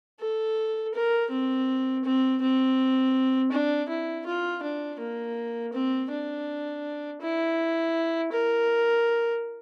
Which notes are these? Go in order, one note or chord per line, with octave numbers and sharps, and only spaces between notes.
A4
A#4
C4
C4
C4
D4
E4
F4
D4
A#3
C4
D4
E4
A#4